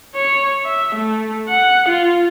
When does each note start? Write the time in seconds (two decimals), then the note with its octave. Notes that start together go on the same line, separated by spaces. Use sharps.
0.16 C#5
0.66 E5
0.95 A3
1.49 F#5
1.89 F4